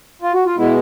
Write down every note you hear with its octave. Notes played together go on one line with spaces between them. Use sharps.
F4
F#4
F4
B2 G#3 B3 E4